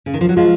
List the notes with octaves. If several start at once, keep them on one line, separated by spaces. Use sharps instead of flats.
C#3
D#3
F3
F#3
F3 G#3 F4